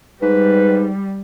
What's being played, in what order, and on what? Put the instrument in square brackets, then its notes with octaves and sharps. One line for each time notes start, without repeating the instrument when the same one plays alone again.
[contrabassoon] G#2 [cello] G3 [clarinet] B4